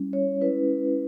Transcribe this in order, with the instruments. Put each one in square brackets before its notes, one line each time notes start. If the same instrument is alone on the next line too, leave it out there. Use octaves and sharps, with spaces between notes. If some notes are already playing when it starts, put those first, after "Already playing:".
Already playing: [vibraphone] G3 C#4 E4
C#5
G#3 C#4 E4 B4